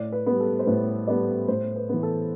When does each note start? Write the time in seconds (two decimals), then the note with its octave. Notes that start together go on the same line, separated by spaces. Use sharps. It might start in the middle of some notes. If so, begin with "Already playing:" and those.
Already playing: A2 D5
0.12 B4
0.26 G3 B3
0.40 A4
0.59 C5
0.66 A2 B4
1.07 G3 B3 D5
1.48 A2 C5
1.76 B4
1.89 E3 B3
2.03 A4